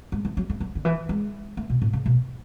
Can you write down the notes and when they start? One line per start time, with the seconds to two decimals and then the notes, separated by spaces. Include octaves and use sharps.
0.12 G#3
0.25 E3
0.37 F#3
0.50 A3
0.60 F#3
0.75 D3
0.85 E3
1.09 G#3
1.57 A3
1.70 B2
1.82 A2
1.93 C#3
2.06 B2